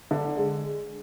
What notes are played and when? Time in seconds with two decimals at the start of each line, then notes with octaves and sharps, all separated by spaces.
0.11 D3
0.37 G#3